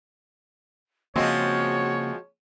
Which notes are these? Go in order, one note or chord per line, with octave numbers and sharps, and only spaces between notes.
C#3 F3 G#3 A#3 C4 F#4 C#5